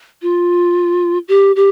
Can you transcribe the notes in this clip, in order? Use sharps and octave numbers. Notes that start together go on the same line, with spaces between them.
F4
G4
G4